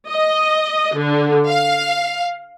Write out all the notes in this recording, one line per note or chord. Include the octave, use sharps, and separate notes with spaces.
D#5
D3
F5